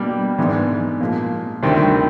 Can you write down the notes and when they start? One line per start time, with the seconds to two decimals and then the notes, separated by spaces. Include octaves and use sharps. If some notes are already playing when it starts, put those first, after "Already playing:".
Already playing: B2 G3 A#3 D4
0.38 G#2 E3 G#3 B3 D4
1.00 A#2 F3 G#3
1.63 D2 C3 D#3 G3 C4